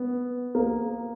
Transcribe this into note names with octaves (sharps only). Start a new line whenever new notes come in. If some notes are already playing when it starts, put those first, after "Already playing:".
Already playing: B3
A#3